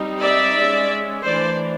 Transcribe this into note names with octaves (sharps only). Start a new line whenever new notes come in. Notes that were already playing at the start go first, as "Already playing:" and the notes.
Already playing: G3 C4 D#4
D5 E5
G#3 C#4
E3 A3 D4 C5 D5